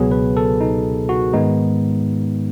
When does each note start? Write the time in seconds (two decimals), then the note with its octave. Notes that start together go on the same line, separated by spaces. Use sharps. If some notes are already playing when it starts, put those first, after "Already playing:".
Already playing: C#2 B2 F#3 B3 G#4
0.11 B4
0.37 A4
0.61 D#4
1.09 F#4
1.33 G#2 D#3 G#3 B3 D#4